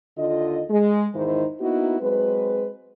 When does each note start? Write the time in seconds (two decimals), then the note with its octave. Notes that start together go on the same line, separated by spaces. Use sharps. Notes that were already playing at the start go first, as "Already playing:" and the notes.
0.18 D#2 D3 F4 D#5
0.70 G#3
1.14 E2 G#2 D#3 D#4 E4 C5
1.61 A#3 B3 D#4 E4 F#4
2.00 F#3 G#3 C4 B4